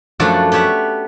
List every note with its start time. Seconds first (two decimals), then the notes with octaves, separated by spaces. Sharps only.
0.20 F#2 F3 A3 D4 A4 F#5
0.52 B3 G4 C#5 E5 F#5